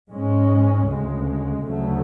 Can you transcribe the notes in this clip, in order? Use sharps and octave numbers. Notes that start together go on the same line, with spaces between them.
G#2 G#3 C#4
D2 C#3 G#3
D2 C#3 F#3 A3